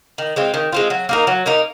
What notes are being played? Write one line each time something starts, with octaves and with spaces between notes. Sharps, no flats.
D#3
G#3 C4 F4
D#3
G#3 C4 F4
F#3
A#3 D#4 A#4
F#3
A#3 D#4 A#4